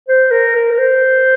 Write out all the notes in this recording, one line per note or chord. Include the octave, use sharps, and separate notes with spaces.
C5
A#4
A#4
A#4
C5